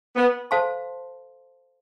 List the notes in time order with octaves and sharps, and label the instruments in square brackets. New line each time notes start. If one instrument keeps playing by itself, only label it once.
[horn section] B3
[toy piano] A4 C5 F5 A5 C6